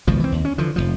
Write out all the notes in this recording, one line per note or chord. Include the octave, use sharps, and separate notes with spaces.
G#1 C#2 B2 F3
E3 C4
D#2
C#4
D3 E3 F3
F1 C2 F3